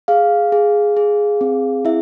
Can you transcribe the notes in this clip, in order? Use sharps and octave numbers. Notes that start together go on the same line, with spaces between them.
G#4 F5
G#4
G#4
C4
E4 E5